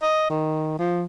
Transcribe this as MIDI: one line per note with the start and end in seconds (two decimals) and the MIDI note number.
0.02 0.26 75
0.30 0.76 51
0.79 1.03 53